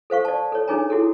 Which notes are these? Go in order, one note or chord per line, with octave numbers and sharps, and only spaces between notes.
A4 C5 F5 C#6
D5 A5
A4 C#5
D4 D#4 G#4 C#5 G#5 A#5
E4 F#4 G#4 A4